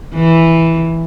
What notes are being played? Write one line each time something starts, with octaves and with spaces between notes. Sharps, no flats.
E3